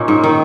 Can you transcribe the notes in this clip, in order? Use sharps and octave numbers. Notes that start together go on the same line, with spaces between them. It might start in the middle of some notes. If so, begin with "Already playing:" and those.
Already playing: A#2 C#4 D#4
G#2
D#3